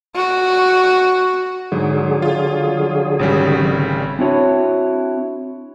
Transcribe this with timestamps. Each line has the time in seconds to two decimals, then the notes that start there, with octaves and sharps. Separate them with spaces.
0.16 F#4
1.72 G#2 D3 F#3 G#4
2.22 F4
3.19 G#1 C#3 G3
4.19 C4 D4 E4 F#4 C#5